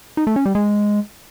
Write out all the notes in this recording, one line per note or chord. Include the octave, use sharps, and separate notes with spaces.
D#4
A3
C#4
G3
G#3